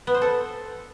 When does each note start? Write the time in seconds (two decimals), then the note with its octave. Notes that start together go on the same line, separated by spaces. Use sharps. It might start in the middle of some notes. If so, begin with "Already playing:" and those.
0.07 B3
0.14 C5
0.22 A4